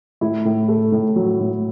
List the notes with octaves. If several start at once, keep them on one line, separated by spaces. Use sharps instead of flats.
A2 E4
A2
A3
A2
F#3
A2